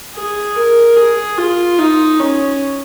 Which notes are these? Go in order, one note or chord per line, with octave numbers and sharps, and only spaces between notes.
G#4
A#4
G#4
F4
D#4
C#4